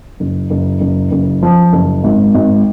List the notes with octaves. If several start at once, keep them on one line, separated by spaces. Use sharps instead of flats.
F#1
F#1
F#1
F#1
F3
F#1
G#1
G#1